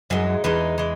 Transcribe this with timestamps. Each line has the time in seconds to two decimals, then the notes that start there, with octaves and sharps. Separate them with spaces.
0.10 F#2 E3 G#3 D#4
0.44 E2 E3 G#3 D#4
0.78 E3 G#3